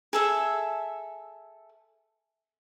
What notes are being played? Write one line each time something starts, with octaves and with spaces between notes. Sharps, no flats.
G#4 A4 E5